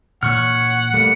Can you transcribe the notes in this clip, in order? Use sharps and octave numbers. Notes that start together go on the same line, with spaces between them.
A#2 E3 A#3 C#5 F#5 C#6 F6
G3 A3 A#3 C#7